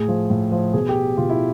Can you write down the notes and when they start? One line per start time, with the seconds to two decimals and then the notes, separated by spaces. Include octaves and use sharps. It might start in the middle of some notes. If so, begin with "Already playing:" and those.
Already playing: A2 G#4
0.08 F3
0.30 A2
0.52 F3
0.73 B2 G#4
0.89 G4
1.17 B2 F4
1.30 E4